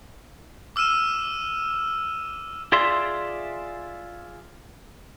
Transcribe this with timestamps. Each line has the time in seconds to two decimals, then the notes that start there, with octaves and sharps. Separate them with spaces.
0.76 D6 E6 F6 D#7 E7
2.72 F4 G#4 D5 E5 C6